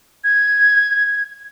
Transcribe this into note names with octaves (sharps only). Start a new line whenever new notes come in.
G#6